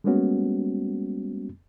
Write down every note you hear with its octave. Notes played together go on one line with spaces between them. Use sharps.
G3 G#3 A#3 B3 C#4 F#4